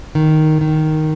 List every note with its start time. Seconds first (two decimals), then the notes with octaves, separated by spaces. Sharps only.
0.15 D#3
0.61 D#3